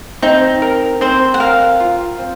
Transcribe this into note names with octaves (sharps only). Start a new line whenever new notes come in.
C4 D#4
A#4
C4 C5
F#5
A#4 F5
F4
C4